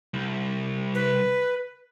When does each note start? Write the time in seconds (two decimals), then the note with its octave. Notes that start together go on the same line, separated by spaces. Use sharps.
0.14 C2
0.95 B4